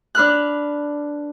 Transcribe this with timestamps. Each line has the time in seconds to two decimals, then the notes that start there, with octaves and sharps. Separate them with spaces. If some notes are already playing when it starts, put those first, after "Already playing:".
0.15 D4 B4 F6 F#6